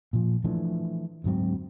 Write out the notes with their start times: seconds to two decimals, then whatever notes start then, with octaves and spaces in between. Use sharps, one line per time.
0.13 A#2 F3
0.44 E3 F3 A3 D4
1.24 D2 G#2 F#3 C4